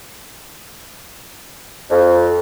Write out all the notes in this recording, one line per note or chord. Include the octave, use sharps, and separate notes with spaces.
F2